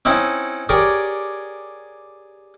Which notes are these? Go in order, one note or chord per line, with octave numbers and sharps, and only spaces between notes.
C4 C#4 D#4 E4 F#5
G4 G#4 A#4 C#5 D5